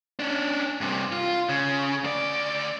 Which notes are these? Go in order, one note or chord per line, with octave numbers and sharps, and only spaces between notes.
C#4 D4
G2 C3
F4
C#3
D2 D5